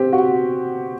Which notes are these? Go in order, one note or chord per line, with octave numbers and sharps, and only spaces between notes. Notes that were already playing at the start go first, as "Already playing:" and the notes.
Already playing: C4 G4
F#4